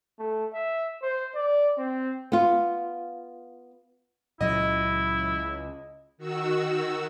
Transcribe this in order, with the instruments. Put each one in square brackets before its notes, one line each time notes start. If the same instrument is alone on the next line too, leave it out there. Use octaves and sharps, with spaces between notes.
[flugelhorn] A3
E5
C5
D5
C4
[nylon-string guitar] B3 F4
[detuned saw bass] C#2 [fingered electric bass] A#2 F#3 [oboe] E4 [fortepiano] D#5
[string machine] D#3 F#4 E6